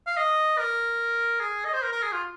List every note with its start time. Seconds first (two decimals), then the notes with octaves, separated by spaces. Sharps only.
0.07 F5
0.17 D#5
0.58 A#4
1.40 G#4
1.65 D#5
1.74 C5
1.82 A#4
1.93 A#4
2.03 G#4
2.12 F4